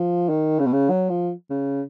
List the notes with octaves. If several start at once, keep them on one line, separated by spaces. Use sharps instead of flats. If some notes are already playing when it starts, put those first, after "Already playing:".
Already playing: F3
D#3
C#3
B2
C#3
F#3
F3
C#3